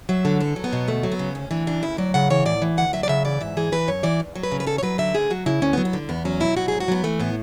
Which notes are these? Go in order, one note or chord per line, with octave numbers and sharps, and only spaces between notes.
F#3 E5
D3 A4
E2 A4
F#3
B3
B2
D2 A3
F#3
B3
C#3
D2 C#4
E3 D4
C#3 D4
D2 E4
F#3 D5
C#3 F#5
E3 C#5
A2 D5
E3
D2 F#5
F#3 E5
D5
C#3 E5
E3 D5
G#2 E5
E3 G#4
E3 B4
F#2 C#5
E3 D5
E2
F#3
B4
C#3
B4
E2 A4
C#5
F#3 B4
D3 E5
D2 G#4
F#3 F#4
C#3 E4
D2 C#4
B3
F#3
B3
D3
E2 B3
F#3 C#4
B2 E4
F#3 F#4
G#2 G#4
F#4
F#3 B3
E3 A3
A2 B3